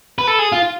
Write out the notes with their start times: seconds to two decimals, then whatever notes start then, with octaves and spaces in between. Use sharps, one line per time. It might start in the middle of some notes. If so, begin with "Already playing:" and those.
0.18 B4
0.27 A4
0.39 G#4
0.52 F4